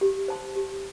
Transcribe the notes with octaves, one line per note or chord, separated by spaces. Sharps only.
G4
C5 A5 C6
G4